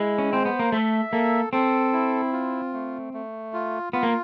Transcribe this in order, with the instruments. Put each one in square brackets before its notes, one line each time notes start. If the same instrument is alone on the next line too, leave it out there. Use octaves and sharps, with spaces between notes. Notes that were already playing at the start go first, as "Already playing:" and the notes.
Already playing: [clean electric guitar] G#3 [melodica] E4
[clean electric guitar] C#4
[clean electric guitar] C4 [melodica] C5
[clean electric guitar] B3
A#3
[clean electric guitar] A3 [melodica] E5
[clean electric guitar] A#3 [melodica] A4
[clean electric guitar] C4 [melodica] A4
[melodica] E4
F4
A3
A3
F4
[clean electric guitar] B3 [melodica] F4
[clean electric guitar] A#3